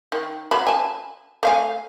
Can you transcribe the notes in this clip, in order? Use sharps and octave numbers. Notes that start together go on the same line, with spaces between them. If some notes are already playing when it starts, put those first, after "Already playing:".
D#3
F#3 B5
G#5 A5
A3 F5 G#5